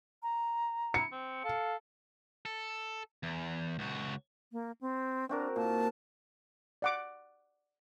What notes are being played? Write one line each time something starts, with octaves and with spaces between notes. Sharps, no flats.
A#5
E4 C#7
C4
A4 F5
A4
E2
C#2 F#4
A#3
C4
C4 D4 F#4 A#4
A#2 A5
D5 F#5 D6